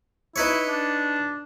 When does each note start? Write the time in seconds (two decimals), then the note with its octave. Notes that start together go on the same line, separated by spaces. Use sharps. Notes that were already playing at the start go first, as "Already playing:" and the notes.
0.36 D#4 E4 B4 C#5
0.68 D4